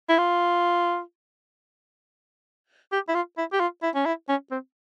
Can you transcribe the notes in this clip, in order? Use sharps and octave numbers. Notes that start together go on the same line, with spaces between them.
E4
F4
G4
E4
F4
E4
G4
F4
E4
C#4
E4
C#4
C4